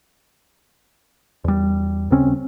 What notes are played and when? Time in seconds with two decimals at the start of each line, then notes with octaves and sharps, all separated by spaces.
1.44 E2 G3
2.11 D#2 C#3 C4 C#4